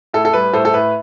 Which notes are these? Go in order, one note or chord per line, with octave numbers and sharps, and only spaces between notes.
A2 A4
A4
G3 B4
A2 A4 C5
A4
A2 B4